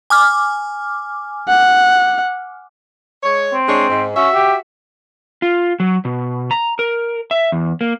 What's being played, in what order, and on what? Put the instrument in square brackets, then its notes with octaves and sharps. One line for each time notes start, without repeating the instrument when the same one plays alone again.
[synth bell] G#5 D6 F6
[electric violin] F#5
[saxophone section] G#3 C#5
[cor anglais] C4
[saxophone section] G#3 D4 C#5
G#2
[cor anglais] C#4 [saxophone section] F#4 E5
[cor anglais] G4
[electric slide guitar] F4
F#3
B2
A#5
A#4
E5
E2
A#3